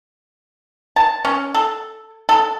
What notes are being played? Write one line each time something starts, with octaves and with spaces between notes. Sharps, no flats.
A5
C#4
A4
A4